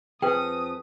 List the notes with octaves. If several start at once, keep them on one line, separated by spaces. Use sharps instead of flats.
F2 G#4 B4 G5 D#6